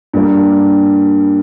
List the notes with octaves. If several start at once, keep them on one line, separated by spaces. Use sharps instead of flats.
G2 G3 A#3